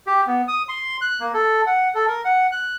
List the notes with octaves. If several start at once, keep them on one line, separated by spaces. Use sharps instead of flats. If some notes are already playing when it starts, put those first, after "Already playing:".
G4
B3
D#6
C6
F#6
A#3
A4
F#5
A4
A#4
F#5
F#6